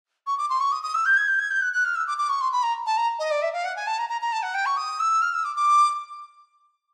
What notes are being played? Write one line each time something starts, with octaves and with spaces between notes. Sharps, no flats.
C#6
D6
C6
C#6
D#6
D#6
E6
G6
G#6
G6
G#6
G6
F#6
F#6
F6
E6
D6
D6
C#6
C6
B5
A#5
A5
A#5
D#5
D5
E5
F5
F#5
G#5
A5
A#5
A#5
A#5
A5
F#5
G5
C#6
D#6
E6
F6
E6
D6
D6